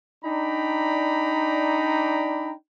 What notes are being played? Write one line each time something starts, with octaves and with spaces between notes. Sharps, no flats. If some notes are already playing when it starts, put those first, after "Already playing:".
D4 D#4 D5 G5 A#5 B5